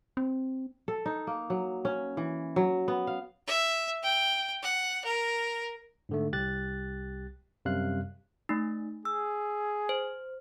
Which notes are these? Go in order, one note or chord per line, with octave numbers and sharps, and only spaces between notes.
C4
A4
D#4
A#3
F#3
C#4
E3
F#3
B3
F5
E5
G5
F#5
A#4
G#2 D3 A3
C2 G4 F#6 A6
F#2 C3 G3 F5 F#6
A3 D#4
G#4 E6
C5